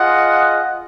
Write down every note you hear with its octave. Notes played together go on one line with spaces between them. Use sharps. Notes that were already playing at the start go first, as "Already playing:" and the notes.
Already playing: F4 G#4 D#5 F#5